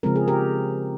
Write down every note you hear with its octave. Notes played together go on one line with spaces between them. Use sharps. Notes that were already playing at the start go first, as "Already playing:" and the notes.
C#3 F3 G#3 C4 A#4
G#4
G4 A#4